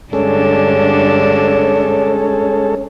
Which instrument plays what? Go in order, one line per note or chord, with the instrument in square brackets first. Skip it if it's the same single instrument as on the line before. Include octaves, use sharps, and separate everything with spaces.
[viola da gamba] G2 D3 D4 [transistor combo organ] G#3 C#4 A4 [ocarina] C#5